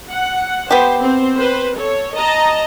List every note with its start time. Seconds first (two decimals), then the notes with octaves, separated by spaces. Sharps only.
0.11 F#5
0.71 B3 G4 C5
1.01 C4 C5
1.37 B4 C5
1.79 A4 C#5
2.17 D#5 A5 A#5